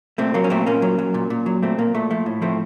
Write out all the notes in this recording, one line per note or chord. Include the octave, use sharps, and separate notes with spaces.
A#2 A3 C4
F#3 A#3
C#4
A#2 A3 C4
A#2 A#3 C#4
F#3
F#3
A#2
A#2
F#3
A#2 A3 C4
A#2 A#3
A#2 A3
F3 A3
A2
F3 A3 C4